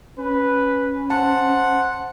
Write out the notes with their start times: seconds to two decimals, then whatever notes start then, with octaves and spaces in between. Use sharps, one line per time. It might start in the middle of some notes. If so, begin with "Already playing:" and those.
0.18 C#4 B4
1.10 C5 F#5 A5